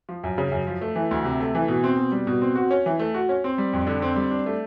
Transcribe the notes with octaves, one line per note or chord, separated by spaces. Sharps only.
F3
F#2
C#3
F#2
F3
A3
E3
D2
C3
A3
E3
B2
C4
B2
G3
B2
C4
F#4
C#4
E3
A3
F#4
C#4
C4
G3
F2
D3
C4
G3
D4
A3